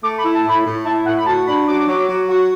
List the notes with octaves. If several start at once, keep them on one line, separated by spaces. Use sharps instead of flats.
A3 D6
B5
E4
A5
A2 B5
A2
E4 A5
A2 F#5
B5
F#4 A5
D4 B5
F#3 D6
F#3
F#3
F#4